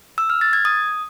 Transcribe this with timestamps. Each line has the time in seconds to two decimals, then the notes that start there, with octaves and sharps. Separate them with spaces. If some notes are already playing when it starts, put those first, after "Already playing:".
0.18 E6
0.30 F6
0.41 A6
0.53 G#6
0.65 D#6